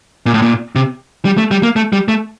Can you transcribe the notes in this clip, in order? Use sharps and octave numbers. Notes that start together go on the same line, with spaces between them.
A#2
A2
A#2
C3
G3
A3
G3
A#3
A3
G3
A3